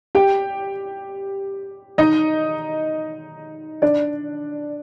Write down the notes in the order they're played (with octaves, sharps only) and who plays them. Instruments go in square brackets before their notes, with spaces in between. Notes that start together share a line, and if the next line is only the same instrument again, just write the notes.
[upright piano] G4 G5
D#4 D#5
D4 D5